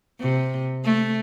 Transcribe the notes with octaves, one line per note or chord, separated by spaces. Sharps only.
C3
A3